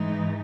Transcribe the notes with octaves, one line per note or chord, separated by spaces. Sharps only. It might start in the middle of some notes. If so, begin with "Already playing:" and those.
Already playing: G#2 E3 G#3 D#4